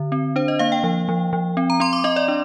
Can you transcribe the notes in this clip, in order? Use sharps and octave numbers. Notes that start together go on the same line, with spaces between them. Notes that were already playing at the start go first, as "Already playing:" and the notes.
Already playing: D3
C4
D4 C5
D#5
A#3 F5
G5
F3
F3
F3
C4
A#5
C4 C6
D6
C4 D#5
D5
D4